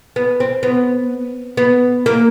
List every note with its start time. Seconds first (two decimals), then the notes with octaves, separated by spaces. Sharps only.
0.16 B3
0.40 C4
0.63 B3
1.57 B3
2.06 A#3